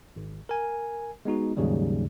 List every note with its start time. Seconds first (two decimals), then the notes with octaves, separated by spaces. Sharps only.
0.16 G#1
0.49 A#4 G#5
1.25 G#3 B3 D#4 F#4
1.57 D#2 G#2 C#3 F#3 G3